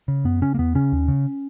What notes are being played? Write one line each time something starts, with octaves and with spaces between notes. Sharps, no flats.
C#3
F#2 B3
C#3 C#4
A#3
E2 B3
C#3 C#4
D#2
C#3